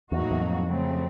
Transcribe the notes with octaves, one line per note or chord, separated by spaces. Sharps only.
E2 A2 F#3 A#3 D#4 F#4
E2
F2
C#3 F#3 A3 C4